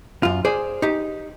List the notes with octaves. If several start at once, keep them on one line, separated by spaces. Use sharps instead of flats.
F#2 F4
G#4 C5 D5
D#4 G4